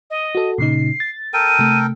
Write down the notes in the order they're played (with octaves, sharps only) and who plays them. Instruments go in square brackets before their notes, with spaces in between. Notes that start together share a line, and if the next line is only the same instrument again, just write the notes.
[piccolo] D#5
[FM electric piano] F#4 A4
[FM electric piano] A#2 C#3 D#4 [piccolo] C7
[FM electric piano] A6
[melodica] A4 A#4 G5 [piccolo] D#7
[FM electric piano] C3 A3